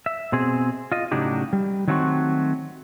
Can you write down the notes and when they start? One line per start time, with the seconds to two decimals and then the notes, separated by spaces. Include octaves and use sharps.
0.06 E5
0.32 B2 C4 G#4
0.92 F4 D#5
1.11 A2 C#3 F#3 D4 D#4 G4
1.53 G3
1.88 D#3 F#3 A3 C4 F4 F#4